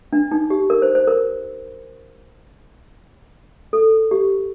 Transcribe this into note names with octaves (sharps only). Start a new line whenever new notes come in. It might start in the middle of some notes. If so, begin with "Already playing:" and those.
D4
D#4
G4
A#4
C5
C5
A#4
A4
G4